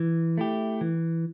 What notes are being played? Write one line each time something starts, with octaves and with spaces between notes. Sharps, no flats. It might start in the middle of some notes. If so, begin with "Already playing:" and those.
Already playing: E3
A3 E4 G4
E3